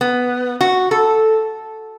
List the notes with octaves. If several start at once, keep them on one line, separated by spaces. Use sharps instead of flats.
B3
F#4
A4